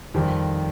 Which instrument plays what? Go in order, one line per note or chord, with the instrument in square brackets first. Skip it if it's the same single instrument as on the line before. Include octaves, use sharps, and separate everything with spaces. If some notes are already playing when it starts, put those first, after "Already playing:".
[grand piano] F2 D#3 G3 C4 G4